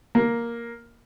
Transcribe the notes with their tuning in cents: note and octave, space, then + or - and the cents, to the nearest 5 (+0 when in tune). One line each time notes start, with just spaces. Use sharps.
A#3 +5